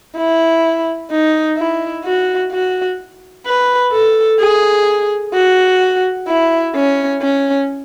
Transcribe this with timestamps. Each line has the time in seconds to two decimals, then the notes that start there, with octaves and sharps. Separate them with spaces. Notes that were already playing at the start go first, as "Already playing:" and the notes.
0.17 E4
1.11 D#4
1.58 E4
2.05 F#4
2.52 F#4
3.46 B4
3.93 A4
4.40 G#4
5.34 F#4
6.28 E4
6.75 C#4
7.22 C#4